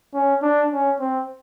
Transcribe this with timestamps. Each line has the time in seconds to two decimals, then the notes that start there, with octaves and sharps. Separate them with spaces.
0.14 C#4
0.42 D4
0.71 C#4
1.00 C4